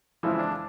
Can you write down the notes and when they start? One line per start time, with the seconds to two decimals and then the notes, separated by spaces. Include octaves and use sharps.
0.23 F2 C#3 E3 F3 G#3 C4 E4
0.39 D4